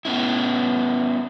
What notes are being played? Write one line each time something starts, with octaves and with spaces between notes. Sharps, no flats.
B3 C#4 E4